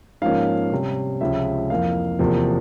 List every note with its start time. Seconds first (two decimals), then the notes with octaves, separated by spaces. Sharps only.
0.22 G#2 F3 A#3 C#4 F5
0.72 C3 G3 C#4
1.21 C#2 C3 F3 G#3 C#4 E5
1.70 F2 E3 A#3 F5
2.19 E2 C3 F3 A#3